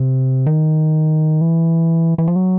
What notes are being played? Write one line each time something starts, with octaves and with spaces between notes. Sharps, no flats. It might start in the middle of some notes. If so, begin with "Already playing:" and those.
Already playing: C3
D#3
E3
E3
F3
F#3